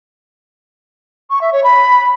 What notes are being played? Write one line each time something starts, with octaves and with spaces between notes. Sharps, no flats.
C#6
E5
C#5
B5